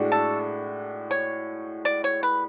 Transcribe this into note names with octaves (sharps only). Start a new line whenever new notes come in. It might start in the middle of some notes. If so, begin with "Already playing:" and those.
Already playing: A2 G#3 D4 F#4
A4
C#5
D5
C#5
B4